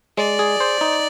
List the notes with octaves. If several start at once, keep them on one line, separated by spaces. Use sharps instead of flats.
G#3 D5
G#4
C5
D#4